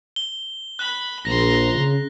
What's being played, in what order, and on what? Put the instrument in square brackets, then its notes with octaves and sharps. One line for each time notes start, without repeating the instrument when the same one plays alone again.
[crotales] G7
[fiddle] B5 [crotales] F#6
[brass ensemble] A#1 [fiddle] A#5 C6 [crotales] A#6
[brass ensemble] C#3